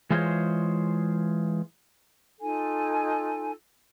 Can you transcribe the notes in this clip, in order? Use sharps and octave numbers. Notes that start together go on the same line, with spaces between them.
E3 G#3 F4 G#4 C5 C#5
D#4 F4 A4 G#5